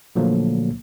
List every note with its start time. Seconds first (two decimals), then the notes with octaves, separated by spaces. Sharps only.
0.16 A#2 D3 F3 F#3 A3 A#3